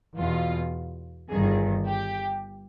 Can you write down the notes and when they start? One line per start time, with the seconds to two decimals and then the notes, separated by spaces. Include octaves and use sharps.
0.16 E2 B2 F4
1.28 G1 G2 D#3 G#4
1.85 G4